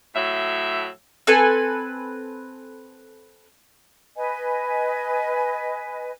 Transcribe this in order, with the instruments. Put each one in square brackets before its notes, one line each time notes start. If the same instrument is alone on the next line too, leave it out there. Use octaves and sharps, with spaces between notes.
[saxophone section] A2 F#3 E5
[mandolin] C4 A4 B4 G#5
[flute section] B4 D#5 G#5